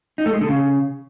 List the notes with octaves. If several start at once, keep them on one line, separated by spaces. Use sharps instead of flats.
D#4
A3
G#3
D3
C#3